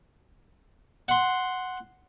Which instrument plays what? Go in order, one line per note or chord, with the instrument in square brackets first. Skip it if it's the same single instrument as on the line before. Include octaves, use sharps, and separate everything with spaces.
[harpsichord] F#5 C6